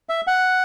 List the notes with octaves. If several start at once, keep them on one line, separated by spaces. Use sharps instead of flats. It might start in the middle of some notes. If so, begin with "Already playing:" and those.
E5
F#5